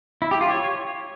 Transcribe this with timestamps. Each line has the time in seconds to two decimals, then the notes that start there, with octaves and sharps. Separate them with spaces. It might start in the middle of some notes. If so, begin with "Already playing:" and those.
0.22 E4
0.31 G4
0.41 F4
0.50 C#5